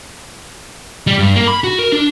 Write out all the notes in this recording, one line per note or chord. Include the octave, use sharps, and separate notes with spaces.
G3
G2
A#3
B5
F#4
A#4
D4